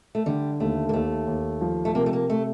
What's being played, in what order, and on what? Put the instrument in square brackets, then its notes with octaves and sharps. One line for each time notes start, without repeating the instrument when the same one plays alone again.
[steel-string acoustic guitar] A3
[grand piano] D3 [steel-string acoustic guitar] G3
[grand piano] D#2 [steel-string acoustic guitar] A3
[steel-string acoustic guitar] A#3
[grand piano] D#2 [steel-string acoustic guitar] A3
[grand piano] D#2
F3
[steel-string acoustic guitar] A3
[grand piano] C3 [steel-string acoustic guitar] A#3
[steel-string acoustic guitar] A3
A#3
A3